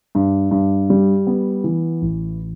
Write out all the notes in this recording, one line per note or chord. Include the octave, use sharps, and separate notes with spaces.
G2
G2
G3
B3
E3
A1